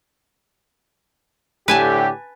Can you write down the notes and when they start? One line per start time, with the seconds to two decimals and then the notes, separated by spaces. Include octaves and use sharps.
1.68 A2 D3 G4 B4 G#5 A5